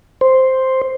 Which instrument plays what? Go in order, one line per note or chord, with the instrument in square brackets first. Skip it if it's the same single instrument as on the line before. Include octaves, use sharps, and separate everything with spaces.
[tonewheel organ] C5